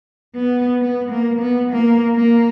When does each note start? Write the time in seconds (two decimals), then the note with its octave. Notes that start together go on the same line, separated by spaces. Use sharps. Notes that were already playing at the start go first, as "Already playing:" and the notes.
0.35 B3
0.81 B3
1.11 A#3
1.41 B3
1.71 A#3
2.15 A#3